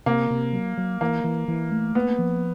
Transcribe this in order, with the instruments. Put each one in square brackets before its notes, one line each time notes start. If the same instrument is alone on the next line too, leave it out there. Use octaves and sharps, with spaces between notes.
[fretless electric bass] C3 [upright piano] A#3
[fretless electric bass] C3
F#3
F#3
[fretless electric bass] E3 [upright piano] A#3
[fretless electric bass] E3
E3
A3
[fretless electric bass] A#3 [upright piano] B3
[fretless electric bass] F3